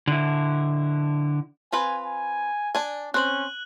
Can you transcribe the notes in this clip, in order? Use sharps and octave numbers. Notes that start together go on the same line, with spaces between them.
D3 E4
C4 F4 B4 G#5
G#5
D4 G#5
C4 C#4 C5 F#6 F#7